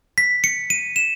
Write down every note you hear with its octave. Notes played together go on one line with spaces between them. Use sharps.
B6
C#7
D#7
E7